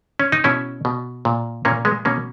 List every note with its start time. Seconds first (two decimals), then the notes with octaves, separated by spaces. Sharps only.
0.20 C#4
0.32 D#4
0.44 B2 C#4 E4
0.85 B2
1.25 A#2
1.65 A#2 A#3 C#4
1.85 G#3 B3
2.05 B2 A#3 C#4